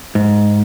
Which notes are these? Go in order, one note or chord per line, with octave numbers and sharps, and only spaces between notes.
G#2